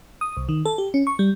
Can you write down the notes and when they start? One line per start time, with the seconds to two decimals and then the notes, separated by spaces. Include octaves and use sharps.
0.21 D#6
0.37 C2
0.49 D#3
0.66 A4
0.78 G4
0.94 C#4
1.07 C#6
1.19 G3